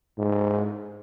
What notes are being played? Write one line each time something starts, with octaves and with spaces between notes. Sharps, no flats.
G#2